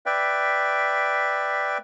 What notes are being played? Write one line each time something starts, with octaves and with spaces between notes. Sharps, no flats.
B4 D5 E5 G5